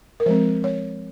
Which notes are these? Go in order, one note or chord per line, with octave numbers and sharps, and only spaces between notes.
A#4
F3 G#3 C4 C5
C#5